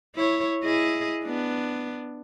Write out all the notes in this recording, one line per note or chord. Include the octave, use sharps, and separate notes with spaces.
E4 C#5
E4 G#4 D#5
B3 D4